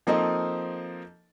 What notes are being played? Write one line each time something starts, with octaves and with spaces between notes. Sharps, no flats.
F3 A#3 C4 D#4 A4 D#5